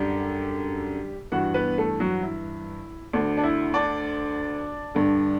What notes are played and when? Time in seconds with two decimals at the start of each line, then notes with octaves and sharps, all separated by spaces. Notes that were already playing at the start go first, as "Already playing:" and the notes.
Already playing: F#2 D3 G3 G4
1.32 G2 E3 F#4 F#5
1.54 B3 B4
1.78 A3 A4
2.00 F#3 F#4
2.23 E4
3.13 D2 D3 D4
3.37 D4
3.43 E4
3.74 D4 D5
4.95 G2 D3